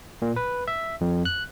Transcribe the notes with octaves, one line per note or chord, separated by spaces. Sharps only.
A#2
B4
E5
F2
F#6